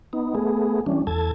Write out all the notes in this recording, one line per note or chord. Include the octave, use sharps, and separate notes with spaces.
B3 D#4
A3 B3 G#4
E3 G3 C#4 D4
E2 A4 A5 G#6